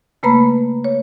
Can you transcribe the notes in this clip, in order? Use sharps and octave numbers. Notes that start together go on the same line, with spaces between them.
C#3 A3 A#3 B4 A#5 B5
C#5